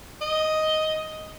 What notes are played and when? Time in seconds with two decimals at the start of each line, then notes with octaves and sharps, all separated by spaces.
0.21 D#5